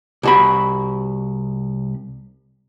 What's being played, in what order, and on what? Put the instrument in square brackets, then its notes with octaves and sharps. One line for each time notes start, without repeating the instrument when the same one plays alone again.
[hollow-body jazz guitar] C2 F#4 B5